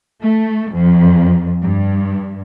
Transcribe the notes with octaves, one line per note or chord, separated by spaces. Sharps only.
A3
F2
G2